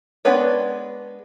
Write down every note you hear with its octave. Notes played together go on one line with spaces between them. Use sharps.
G#3 B3 D4 B4 C#5